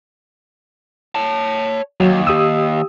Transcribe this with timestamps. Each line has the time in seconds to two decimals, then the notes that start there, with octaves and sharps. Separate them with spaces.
1.15 C#5 A5
2.00 D#2 F#3
2.27 G4 D#6 E6